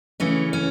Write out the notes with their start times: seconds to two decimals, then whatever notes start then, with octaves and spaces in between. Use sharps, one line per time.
0.20 C#3 E3 A3 C#4
0.53 C#4